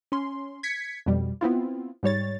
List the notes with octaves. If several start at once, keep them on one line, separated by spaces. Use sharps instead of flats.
C#4 C6
G#6 B6 C#7
F2 B2 G3
B3 C4 E4 F4
G#2 G3 C#5 A6